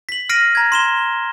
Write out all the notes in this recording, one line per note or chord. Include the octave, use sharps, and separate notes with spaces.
B6 F#7
F6 A#6 C7 D7 D#7
A#5 G#6
C6 E7 G7